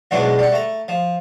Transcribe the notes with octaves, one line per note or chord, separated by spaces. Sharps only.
E2 G#2 B2 F#3 G#3 D4
G3 F#5
A3 A#5
F3